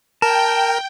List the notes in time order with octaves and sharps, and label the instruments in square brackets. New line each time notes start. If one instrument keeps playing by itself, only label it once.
[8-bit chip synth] A#4 [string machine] G5 [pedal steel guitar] A5